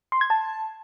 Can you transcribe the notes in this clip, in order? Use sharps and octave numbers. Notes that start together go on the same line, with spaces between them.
C6
G#6
A5